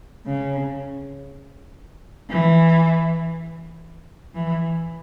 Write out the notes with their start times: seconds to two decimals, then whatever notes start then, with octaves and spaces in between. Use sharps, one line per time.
0.26 C#3
2.30 E3
4.35 E3